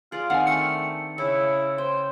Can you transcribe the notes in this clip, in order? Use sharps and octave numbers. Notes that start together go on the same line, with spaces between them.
F4 G#4 D5
D#3 C4 D4 F5 F#5 G#5
A3 C#7
C#3 C#4 E4
C5 G5